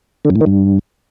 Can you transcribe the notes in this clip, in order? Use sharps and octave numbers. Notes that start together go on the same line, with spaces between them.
D3
F#2
A2
D#3
G2